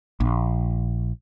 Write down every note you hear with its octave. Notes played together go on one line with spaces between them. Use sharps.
A#1